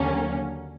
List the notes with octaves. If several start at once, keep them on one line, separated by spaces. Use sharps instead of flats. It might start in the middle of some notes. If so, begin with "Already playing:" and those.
Already playing: D#2 D3 F#3 A#3 C#4